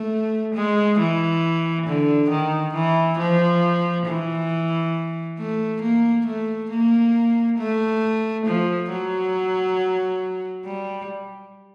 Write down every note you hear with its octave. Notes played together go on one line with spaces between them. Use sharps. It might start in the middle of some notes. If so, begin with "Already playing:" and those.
Already playing: A3
G#3
E3
D3
D#3
E3
F3
E3
A3
A#3
A3
A#3
A3
F3
F#3
G3